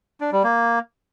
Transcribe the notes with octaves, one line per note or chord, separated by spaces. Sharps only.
D4
G3
A#3